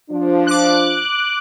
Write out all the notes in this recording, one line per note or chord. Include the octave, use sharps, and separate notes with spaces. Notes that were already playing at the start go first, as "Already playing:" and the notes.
F3 D4
D6 F#6